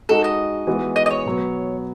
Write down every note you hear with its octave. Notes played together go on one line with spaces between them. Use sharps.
G#3 D#4 F#4 A4
D#5
E3 G#3 B3 F#4
D#5
D#5
C#5
B2 F#3 B3